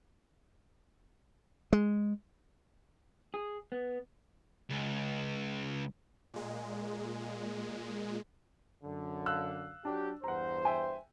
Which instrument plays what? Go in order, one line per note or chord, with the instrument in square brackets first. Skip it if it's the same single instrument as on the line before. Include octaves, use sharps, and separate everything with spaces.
[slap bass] G#3
[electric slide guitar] G#4
B3
[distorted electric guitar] C#2
[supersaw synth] A#2 G#3
[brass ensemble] F#2 D3
[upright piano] F5 E6 F#6
[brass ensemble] F#3 G4 [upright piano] D4
[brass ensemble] E2 G2 C5 [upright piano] F#5 A#5
[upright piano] E5 G5 G#5